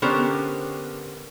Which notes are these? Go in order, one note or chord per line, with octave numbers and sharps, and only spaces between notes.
D3 B3 C#4 G4 A#4 C5